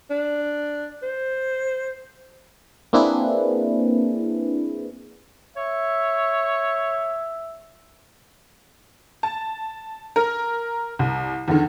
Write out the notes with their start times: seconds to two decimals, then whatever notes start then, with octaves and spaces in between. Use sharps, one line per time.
0.10 D4
1.03 C5
2.93 A#3 C4 D4 E4 G#4 B4
5.57 C#5 E5
9.23 A5
10.16 A#4
10.99 C2
11.48 E2 D3 D#3